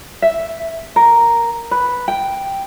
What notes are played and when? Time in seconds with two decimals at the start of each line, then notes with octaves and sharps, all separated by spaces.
0.22 E5
0.96 A#4
1.71 B4
2.08 G5